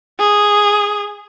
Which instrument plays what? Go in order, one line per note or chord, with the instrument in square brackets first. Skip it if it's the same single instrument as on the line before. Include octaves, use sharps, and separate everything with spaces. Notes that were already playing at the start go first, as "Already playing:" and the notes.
[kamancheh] G#4